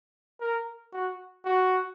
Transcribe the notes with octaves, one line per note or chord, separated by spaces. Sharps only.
A#4
F#4
F#4